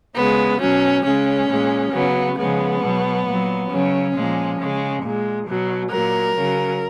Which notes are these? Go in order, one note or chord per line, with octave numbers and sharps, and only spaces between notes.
C#3 G#3 B3
B2 F#3 C#4
C#3 G#3 C#4
A#2 G#3
C#3 F#3 B3
C#3 F3 G#3 B3
B2 F#3
A#2 F#3
C#3 F#3 C#4
A#2 F3 G#3
C#3 G#3
A#2 G#3
B2 F#3
A#2 F#3 A#4
C#3 F#3